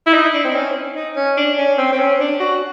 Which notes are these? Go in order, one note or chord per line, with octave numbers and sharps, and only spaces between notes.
E4
D#4
D4
C4
C#4
D#4
C#4
D4
C#4
C4
C4
C#4
D4
F#4